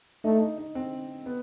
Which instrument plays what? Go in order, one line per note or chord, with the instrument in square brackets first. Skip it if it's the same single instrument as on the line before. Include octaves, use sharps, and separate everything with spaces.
[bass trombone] A3 [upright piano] D#4
[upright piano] D#4
D#4
C4
B3